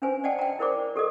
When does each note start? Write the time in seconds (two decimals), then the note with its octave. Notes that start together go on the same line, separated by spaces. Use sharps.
0.02 C#4 D4 B4 C5 G#5
0.24 D5 D#5 F#5 G5 A5
0.39 G5 A#5
0.59 E4 A#4 C5 D5 D6
0.96 G4 A4 A#4 D#5